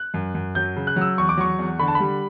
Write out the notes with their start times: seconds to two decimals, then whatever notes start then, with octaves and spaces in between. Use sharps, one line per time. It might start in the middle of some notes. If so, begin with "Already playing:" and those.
Already playing: F#6
0.14 F#2
0.35 F#2
0.55 F#3 G6
0.76 C#3
0.87 F#6
0.96 F#3
1.01 E6
1.18 E2 C#6
1.29 D6
1.38 F#3 C#6
1.59 E2
1.79 D3 B5
1.88 A5
1.95 B5
2.00 G3